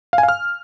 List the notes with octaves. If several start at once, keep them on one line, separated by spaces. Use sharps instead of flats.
F5
G#5
F5
F6